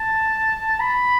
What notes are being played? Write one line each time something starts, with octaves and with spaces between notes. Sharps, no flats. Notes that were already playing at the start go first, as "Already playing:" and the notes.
Already playing: A5
B5